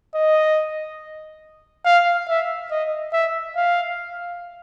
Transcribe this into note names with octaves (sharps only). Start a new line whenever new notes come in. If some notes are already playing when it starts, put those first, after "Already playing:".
D#5
F5
E5
D#5
E5
F5